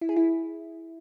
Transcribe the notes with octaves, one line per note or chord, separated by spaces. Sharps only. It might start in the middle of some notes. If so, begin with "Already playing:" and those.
E4
G#4
E4